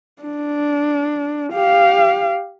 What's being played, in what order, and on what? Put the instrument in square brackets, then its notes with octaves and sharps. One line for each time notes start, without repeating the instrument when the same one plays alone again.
[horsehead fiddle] D4
G4 F5